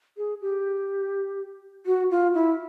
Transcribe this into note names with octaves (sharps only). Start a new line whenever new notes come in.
G#4
G4
F#4
F4
E4